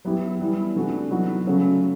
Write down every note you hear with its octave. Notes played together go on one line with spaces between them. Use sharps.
F#3 B3 E4 G4
E3 G3 B3 E4
C3 E3 A3 D4 F#4
F#3 B3 D#4 F#4
C#3 F#3 A3 C#4 F#4